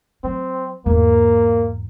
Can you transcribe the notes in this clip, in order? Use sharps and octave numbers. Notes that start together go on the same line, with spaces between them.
F#3 C4
E2 G#2 A#3